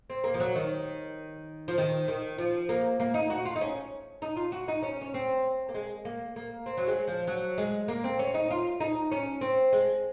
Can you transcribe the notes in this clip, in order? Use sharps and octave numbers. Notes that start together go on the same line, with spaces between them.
C4
A#3
F3
F#3
D#3
F3
D#3
D#3
F3
A#3
A#3
D#4
F#4
F4
D#4
C#4
D#4
F4
F#4
D#4
C#4
C#4
C4
A#3
G#3
A#3
A#3
C4
F#3
G#3
F3
F#3
G#3
A#3
C4
C#4
D#4
F4
D#4
C#4
C4
G#3